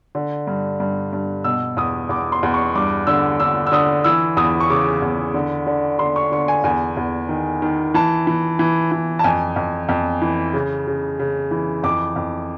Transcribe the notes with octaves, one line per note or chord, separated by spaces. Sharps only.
D3
G2
G2
G2
B2 E6
E2 D#6
E2 D6
C6
E2
C#6
G2 D6
D3 E6
D3 E6
E6
D3 D#6
E3 E6
E2 D#6
C#6
C#3 D6
E2
D3
D3
D3 C6
C#6
D3 C#6
G#5
E2 G#5
E2
D#3
D#3
E3 A5
E3
E3
E3
A5
F2 G#5
F2
F2
E3
C#3
C#3
C#3
E3
F2 D6
F2